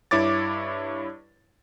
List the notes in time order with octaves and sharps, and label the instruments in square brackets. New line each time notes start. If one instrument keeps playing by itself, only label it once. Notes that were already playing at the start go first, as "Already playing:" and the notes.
[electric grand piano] G2 E4 C#5 D6 A6